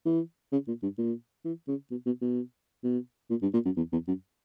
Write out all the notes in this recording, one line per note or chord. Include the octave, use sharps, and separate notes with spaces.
E3
C#3
A#2
G2
A#2
E3
C#3
B2
B2
B2
B2
A#2
G2
A#2
F#2
E2
E2
F#2